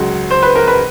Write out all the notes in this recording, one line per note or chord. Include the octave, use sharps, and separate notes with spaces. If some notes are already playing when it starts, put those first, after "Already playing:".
Already playing: C#2 C#3 F#3
C5
B4
A#4
B4